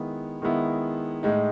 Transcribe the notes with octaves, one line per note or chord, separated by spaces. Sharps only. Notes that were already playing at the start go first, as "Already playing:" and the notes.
Already playing: D#3 G#3 B3 E4
D#3 G#3 B3 E4
A2 G#3 D#4